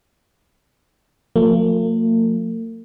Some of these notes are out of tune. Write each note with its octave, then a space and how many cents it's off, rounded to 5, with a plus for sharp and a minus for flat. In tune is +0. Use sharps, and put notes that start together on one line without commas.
F3 +35 A#3 -45